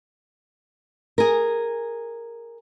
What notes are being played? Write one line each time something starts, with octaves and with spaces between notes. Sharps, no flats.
G#4 A#4